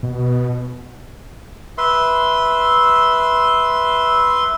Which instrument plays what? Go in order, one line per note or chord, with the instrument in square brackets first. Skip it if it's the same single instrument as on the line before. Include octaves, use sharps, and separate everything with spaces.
[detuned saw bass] B2
[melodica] B4 E5 C6